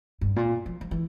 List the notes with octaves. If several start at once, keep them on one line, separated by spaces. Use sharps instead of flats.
G2
A#2
F3
F3
E3